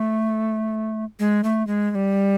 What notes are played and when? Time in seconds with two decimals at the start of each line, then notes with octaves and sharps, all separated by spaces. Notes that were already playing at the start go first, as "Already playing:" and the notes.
Already playing: A3
1.19 G#3
1.44 A3
1.67 G#3
1.91 G#3
1.95 G3